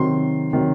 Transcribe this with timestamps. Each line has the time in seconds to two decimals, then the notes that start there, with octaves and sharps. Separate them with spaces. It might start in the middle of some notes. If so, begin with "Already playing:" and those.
Already playing: C3 D#3 F#3 C6
0.53 C3 D#3 F#3